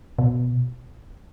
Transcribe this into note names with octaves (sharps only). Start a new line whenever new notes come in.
B2